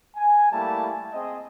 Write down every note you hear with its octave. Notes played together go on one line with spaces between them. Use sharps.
G#5
G3 A3 A#3 E4 A5
C4 G#4 D#5